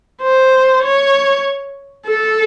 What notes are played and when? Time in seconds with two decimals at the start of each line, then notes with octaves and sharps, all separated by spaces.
0.22 C5
0.84 C#5
2.06 A4